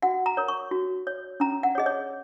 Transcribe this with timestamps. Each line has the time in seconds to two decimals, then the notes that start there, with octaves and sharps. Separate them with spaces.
0.02 F#4 F#5
0.26 A#5
0.37 A#4 C#5
0.48 C#6
0.71 F#4
1.07 C#5
1.40 C#4 A#5
1.63 F#5
1.75 C#5
1.78 G#4 D#5
1.86 C#5